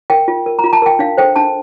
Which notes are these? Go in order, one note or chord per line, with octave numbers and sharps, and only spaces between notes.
A#4 G5
F4
A#4
A#5
F4
A5
A#4 G5
D4 F5
A4 C5 G5
D4 A5